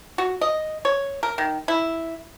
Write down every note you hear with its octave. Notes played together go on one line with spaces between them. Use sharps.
F#4
D#5
C#5
A#4
D#3
E4